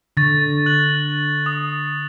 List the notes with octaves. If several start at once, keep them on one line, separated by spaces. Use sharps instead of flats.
D3 C#6 A6 A#6
F#6 F#7
D#6